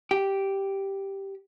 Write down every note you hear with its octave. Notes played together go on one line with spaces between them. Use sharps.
G4